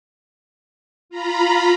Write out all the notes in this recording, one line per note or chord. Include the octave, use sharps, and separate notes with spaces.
F4 A#5 B5